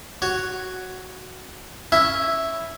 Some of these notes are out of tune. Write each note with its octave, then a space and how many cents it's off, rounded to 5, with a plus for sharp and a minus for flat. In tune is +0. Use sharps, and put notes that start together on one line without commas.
F#4 +0 C#5 +0
C#4 +0 E4 +0 E5 +0